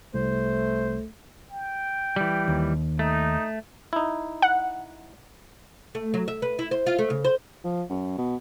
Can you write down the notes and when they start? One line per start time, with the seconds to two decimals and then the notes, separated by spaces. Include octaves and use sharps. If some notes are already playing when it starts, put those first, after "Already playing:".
0.14 C2 A3 C5
1.51 G5
2.16 E3 G3
2.48 D#2
2.99 A3 D#4
3.93 D#4 E4
4.42 F#5
5.95 A3
6.14 F#3
6.28 E5
6.42 B4
6.59 E4
6.71 C5
6.86 F4
6.99 A3
7.10 C#3
7.25 C5
7.64 F3
7.90 F#2
8.18 B2